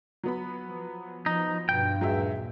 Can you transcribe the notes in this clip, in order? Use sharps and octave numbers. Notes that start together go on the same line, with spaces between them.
F#3 B3 B5
F3
F3 D#4
G2 B2 G5
D#2 A#2 F#3 G#3 E5